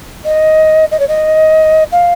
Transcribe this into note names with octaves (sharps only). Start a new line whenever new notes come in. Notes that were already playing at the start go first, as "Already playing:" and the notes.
D#5
D#5
C#5
D#5
F5